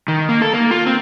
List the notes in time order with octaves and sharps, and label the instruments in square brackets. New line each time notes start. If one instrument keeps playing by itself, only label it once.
[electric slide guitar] D#3
A#3
A4
A#3
F4
C4